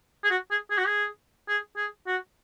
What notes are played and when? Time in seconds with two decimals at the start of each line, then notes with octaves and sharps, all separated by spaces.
0.24 G#4
0.31 F#4
0.51 G#4
0.71 G#4
0.78 F#4
0.86 G#4
1.48 G#4
1.77 G#4
2.07 F#4